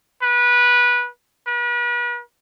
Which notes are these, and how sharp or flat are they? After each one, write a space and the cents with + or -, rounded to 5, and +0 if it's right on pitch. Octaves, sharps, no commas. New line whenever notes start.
B4 -20
B4 -40